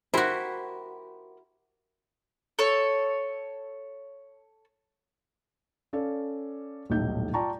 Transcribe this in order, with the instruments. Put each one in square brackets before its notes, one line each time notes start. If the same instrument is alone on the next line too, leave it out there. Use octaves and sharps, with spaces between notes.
[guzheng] E4 F#4 [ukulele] G4 A#4 C5
[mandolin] A4 C#5
[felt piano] C#4 A4 D5 F5
D#1 B1 A2 D#4 G6
F4 D5 G5 A5 A#5 C#6